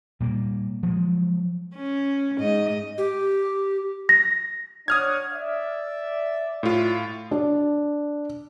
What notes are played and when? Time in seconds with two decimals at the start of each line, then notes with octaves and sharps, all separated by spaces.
0.20 A#2 G3 A#3
0.83 F3 F#3 G#3
1.75 C#4
2.37 G#2 D#5
2.98 G4
4.09 A#6
4.88 D4 C#5 F#5 D#6 F6 G#6
5.32 D5 E5
6.63 A2 F4
7.31 D4